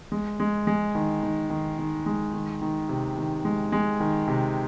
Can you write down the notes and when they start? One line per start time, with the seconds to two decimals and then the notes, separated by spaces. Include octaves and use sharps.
0.12 G#3
0.40 G#3
0.67 G#3
0.95 D#3
1.23 D#3
1.50 D#3
1.79 D#3
2.06 G#3
2.34 D#3
2.62 D#3
2.89 C3
3.17 D#3
3.45 G#3
3.72 G#3
4.00 D#3
4.28 C3